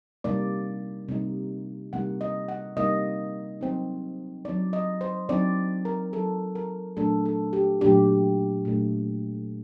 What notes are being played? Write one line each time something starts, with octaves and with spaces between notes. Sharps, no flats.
C3 G3 A#3 D#4 D5
C3 G3 A#3 D#4
C3 G3 A#3 D#4 F#5
D#5
F#5
C3 G3 A#3 D#4 D#5
F#3 C4 D#4
F#3 C4 D#4 D5
D#5
C5
F#3 C4 D#4 D5
A#4
F#3 C4 D#4 A4
A#4
A#2 F#3 A3 D4 A4
A4
G4
A#2 F#3 A3 D4 G4
A#2 F#3 A3 D4